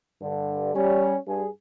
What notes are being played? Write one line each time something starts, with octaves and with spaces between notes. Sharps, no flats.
G2 D3
G3 C#4
G2 G#4